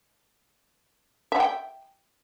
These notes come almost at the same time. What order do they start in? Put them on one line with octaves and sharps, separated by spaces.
E5 F#5 G5